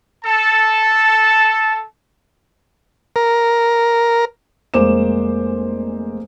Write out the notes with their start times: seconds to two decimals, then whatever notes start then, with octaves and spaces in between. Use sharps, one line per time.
0.25 A4 A5
3.16 A#4
4.74 F1 G#3 A#3 C5 D6 E7